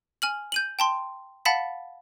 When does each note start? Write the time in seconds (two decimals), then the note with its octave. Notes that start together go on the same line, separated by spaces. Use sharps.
0.22 G#5 F6 F#7
0.52 G6 D#7 F#7
0.79 G5 A5 C6
1.45 F5 F#5 A5 B5 A6 B6